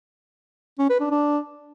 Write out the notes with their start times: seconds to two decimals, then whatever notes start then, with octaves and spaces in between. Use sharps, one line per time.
0.79 C#4
0.89 B4
1.00 D4
1.11 D4